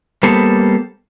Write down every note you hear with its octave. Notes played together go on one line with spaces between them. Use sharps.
G3 A#3 B3 A4 C5